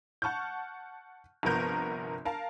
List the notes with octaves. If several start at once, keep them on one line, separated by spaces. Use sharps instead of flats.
F#5 A5 C#6 F6 G6
G1 C2 F3 B3 A#4 G6
A#4 F5 A5